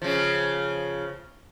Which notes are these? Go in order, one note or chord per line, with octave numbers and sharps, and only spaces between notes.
C#3 F3